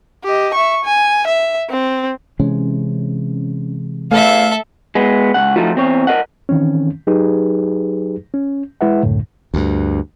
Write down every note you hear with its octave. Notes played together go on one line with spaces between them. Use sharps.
G4 D#5
E5 C#6
G#5
E5
C4
C3 E3 G#3 C#4
E2 D3 A3 A4 E5 F5
G#3 B3
C#2 F#5
F3 A3 D#4 F4 F#4
E2 C4 C#5
A#4 D#5 F#5
D#3 E3 C4 C#4
F#3 D#4 G4 G#4 B4
C#4
G#3 E4 B4 E5 F#5
C#2 F#2 A2 D3
D2 G2